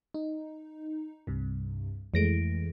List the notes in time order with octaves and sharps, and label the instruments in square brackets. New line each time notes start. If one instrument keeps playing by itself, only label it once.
[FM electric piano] D#4
C2 G2 C3
[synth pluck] F2 A#6 D7 [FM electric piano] E3 G#3 A3